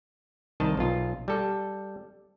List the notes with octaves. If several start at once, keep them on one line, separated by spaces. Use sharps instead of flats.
C2 D#3 D#5 A5
B1 F4
G3 A4